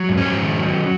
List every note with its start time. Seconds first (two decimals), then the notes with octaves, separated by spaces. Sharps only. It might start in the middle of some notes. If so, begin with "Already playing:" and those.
Already playing: F#3
0.09 G#2
0.18 C#4
0.26 G#2
0.42 D#3
0.58 F#3